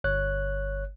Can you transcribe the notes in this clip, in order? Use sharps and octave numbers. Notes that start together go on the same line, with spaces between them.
G1 C#5 F#6